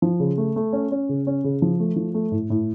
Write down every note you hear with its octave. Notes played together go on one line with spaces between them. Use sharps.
F3
C#3
A3
A3
C#4
C#4
C#3
C#4
C#3
F3
A3
F3
A3
A2
A2